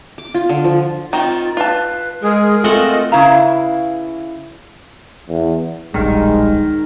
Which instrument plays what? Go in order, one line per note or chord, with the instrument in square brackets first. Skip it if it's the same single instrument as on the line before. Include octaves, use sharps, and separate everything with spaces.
[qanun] D6
F4
D3
F3
[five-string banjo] D#3 C4 [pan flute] F4
[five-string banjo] F4 A5 [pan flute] B4
[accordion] G#3 G#4 [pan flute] A#4
[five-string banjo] G#3 [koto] A3 C4 F#5 [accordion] F4 D#5
[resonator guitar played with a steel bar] C#3 E4 B4 F5 A#5
[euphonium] E2
[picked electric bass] D1 A#1 G3 [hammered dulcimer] D#3 A#4 [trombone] G#3